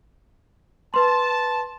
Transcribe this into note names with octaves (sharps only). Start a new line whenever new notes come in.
B4 A5 C6